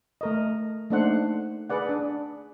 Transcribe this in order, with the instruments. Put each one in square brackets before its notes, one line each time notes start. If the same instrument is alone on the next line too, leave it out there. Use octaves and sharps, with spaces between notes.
[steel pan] A3 A#4 D#5
A3 A#3 D4 D#4 C5 F#5
G#4 B4 D5 F#5
D4